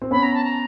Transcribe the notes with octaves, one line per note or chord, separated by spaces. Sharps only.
C4
B3 C#4 B5
A#5
A5
A#5